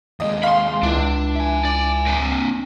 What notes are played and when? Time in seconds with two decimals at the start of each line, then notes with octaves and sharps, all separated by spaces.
0.20 D#2 G#3 D#5
0.43 F5 B5 C6
0.83 C#2 D4 E4
1.36 E5 G#5
1.65 D5
2.07 C4 D4